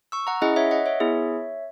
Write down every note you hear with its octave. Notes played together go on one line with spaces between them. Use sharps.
C#6 E6
F#5 A#5
C#4 E4 G#4 D#5 F#5
C#5 E5
D#5 F#5
C#5 E5
B3 E4 G#4